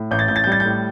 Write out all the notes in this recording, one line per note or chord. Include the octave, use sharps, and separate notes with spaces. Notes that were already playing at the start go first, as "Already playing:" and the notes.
Already playing: A2
A1 G6
A6
A1 G6
A6
G6
G3 A6
G6
A2